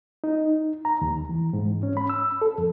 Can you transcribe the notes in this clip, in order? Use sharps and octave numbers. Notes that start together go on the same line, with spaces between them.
D#4
A#5
D#2
E3
G#2
C#4
B5
E6
A4
F2